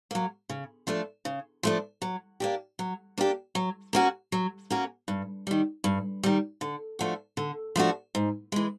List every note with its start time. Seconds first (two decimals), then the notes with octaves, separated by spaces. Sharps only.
0.11 F#3 A#3
0.49 C#3
0.87 F3 A3 D4
1.25 C#3
1.63 F3 A3 D4
2.02 F#3
2.40 A#3 D4 G4
2.79 F#3
3.18 A#3 D4 G4
3.55 F#3
3.93 A#3 C#4 F#4 A#4
4.32 F#3
4.70 A#3 C#4 F#4 A#4
5.08 G2
5.47 D#3 G3
5.84 G2
6.23 D#3 G3
6.61 D3
6.99 F3 A3 D4 F#4
7.37 D3
7.76 F3 A3 D4 F#4
8.15 G#2
8.52 E3 G#3